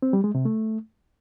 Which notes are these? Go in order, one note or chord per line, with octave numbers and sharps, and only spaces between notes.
C4
G3
G#3
C3
A3